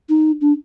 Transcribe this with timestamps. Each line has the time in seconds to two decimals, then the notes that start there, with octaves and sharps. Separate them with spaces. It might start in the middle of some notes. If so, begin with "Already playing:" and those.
0.09 D#4
0.41 D4